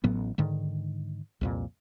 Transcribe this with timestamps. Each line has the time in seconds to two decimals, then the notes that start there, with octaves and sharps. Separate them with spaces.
0.04 A1 A2 F#3 B3
0.38 G#2 D3 D#3
1.41 C2 F2 A#2